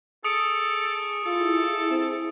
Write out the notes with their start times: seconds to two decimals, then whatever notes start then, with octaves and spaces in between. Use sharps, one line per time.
0.24 G#4 A4 D#6 C#7 D7
0.90 C#6 E6
1.25 E4 F4 G#4 A4
1.91 C4